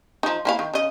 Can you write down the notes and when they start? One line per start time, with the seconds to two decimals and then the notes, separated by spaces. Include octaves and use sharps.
0.23 F3 D#4
0.45 A#3 E4 F5
0.59 D#3
0.74 C#3 D#5